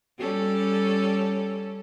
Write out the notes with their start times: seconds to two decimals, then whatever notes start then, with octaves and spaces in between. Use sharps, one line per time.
0.18 G3 C#4 A4